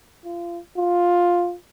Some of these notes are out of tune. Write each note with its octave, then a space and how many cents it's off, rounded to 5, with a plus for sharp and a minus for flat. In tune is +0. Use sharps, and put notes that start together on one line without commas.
F4 -25
F4 +10